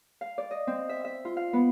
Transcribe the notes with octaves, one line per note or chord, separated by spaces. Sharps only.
F5
D5
D#5
C4
E5
E5
F4
F5
B3